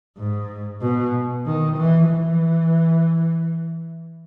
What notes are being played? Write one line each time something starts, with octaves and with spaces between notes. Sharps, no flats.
G#2
B2
D#3
E3
E3